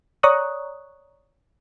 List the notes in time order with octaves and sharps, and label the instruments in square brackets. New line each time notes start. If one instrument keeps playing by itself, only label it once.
[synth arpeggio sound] C#5 D5 A#5 C#6 D#6 F#6